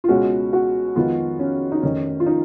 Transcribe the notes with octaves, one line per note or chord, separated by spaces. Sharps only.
F4
C#2 B2 G#3 C#4 F#4
F#4
F2 D#3 G#3 B3 F4
C#4
D#4
F1 F2 D#3 C#4
F4
D#4